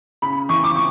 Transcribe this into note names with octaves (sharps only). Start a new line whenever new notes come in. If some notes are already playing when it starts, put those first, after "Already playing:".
C#3 B5
E3 C#6
D6
C#6